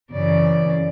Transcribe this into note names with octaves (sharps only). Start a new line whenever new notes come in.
F#2 C#3 E3 D5